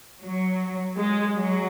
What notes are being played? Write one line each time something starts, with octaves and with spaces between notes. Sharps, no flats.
F#3
G#3
F#3